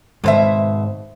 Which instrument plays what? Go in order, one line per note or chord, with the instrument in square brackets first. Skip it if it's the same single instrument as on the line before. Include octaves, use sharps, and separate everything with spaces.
[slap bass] G#2 D#3 G#3 [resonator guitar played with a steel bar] B2 C5 E5